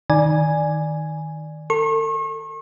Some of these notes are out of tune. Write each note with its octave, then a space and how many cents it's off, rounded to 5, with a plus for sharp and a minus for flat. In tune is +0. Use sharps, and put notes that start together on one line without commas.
D#3 +0 D5 +5 G#5 +0
A4 +35 C#6 -40